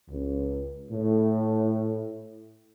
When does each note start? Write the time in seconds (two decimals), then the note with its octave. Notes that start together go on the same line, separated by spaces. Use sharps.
0.10 C#2
0.92 A2